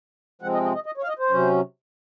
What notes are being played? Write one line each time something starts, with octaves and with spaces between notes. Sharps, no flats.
C3 F3 G#3 C4 F#5
D#5
D#5
D#5
D#5
C#5
F5
D#5
C5
C3 F#3 C#4